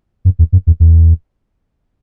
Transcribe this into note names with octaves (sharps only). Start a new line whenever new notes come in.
F#2
E2
F#2
E2
E2